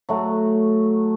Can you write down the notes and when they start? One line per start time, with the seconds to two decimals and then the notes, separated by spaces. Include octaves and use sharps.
0.09 F#3 A3 F#4